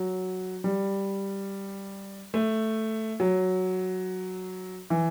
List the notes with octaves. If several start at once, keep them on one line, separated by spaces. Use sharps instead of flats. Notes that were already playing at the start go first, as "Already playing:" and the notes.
Already playing: F#3
G3
A3
F#3
E3